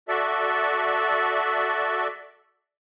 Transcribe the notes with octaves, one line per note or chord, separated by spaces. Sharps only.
F#4 A4 D5 E5